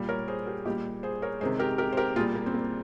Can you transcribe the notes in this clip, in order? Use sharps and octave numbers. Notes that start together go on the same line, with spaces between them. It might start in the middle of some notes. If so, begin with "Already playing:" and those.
Already playing: A#2 G3
A#4 C#5
G#4 C5
G4 A#4
A#2 G3 D#4 G4
G#4 C5
A#4 C#5
C3 D#3 G#3 G#4 C5
G4 A#4
G4 A#4
C5
G4 A#4
A#2 G3 F4 G#4
A#3
C4
A#3